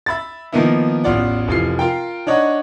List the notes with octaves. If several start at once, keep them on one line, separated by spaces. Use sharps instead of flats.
E5 B5 A6
D#3 F3 A#3 B3 D#4 E4
A1 E2 F4 D5 F#5
F1 E3 F4 C7
F4 A#4 G5
D4 D#4 C#5 D#5 F#5